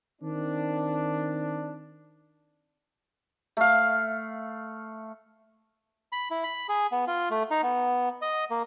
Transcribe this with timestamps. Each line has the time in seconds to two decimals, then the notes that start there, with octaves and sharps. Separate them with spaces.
0.22 D#3 C4 D4
3.57 A3 F5
6.12 B5
6.30 E4
6.44 B5
6.69 G#4
6.92 B3
7.08 F4
7.30 A3
7.51 D#4
7.63 B3
8.22 D#5
8.50 A#3